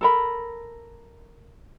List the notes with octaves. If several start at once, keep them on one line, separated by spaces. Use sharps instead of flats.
A4 A#4 B5